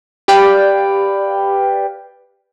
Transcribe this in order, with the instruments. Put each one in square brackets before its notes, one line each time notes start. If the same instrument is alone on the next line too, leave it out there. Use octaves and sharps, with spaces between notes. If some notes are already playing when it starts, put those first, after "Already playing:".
[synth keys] G4 B4 D5 F5 G5